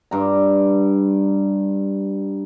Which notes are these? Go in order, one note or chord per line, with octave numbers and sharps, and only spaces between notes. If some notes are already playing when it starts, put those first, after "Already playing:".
G2 A#5